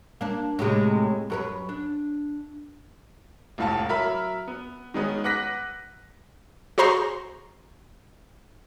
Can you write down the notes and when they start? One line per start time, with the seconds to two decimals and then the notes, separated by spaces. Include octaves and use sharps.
0.21 A#3 D4
0.59 A2 C3 G#3
1.30 F#2 A#4 B4
1.69 D4
3.58 F1 C#2 A2 F5 F#5 A5
3.89 F#3 A#4 E5 B5
4.48 B3
4.94 D#3 G#3 B3 C#4
5.24 B4 F#5 D6 F#6 A#6 B6
6.78 F#4 G#4 C5 A#5 C6 C#6